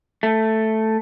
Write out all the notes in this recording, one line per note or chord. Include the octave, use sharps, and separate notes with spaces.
A3